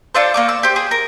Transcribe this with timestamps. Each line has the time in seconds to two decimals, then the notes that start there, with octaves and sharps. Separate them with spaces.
0.15 D4 F4 A4 C5
0.34 A#3 C#6 D6
0.49 E6
0.63 G4 C5
0.76 G#4
0.91 A#4